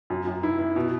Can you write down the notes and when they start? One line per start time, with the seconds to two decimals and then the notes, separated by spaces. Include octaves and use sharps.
0.10 F#2
0.27 F#2
0.43 E4
0.59 E4
0.76 B2